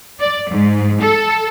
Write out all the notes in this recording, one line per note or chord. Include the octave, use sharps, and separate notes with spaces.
D5
G#2
A4